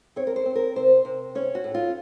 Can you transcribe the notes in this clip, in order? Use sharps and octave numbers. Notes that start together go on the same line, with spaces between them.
C4 C#5
A#4
C5
C4
A#4
C3 C5
C3
C#4 C#5
F#4
A2
F4